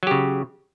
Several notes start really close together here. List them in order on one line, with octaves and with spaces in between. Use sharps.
F#3 G4 C#3